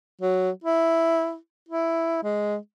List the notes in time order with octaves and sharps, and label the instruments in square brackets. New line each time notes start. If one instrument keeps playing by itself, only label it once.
[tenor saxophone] F#3
E4
E4
G#3